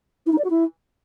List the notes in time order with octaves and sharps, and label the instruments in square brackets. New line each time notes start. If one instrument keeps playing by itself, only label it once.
[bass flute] E4
D#4
D5
F#4
E4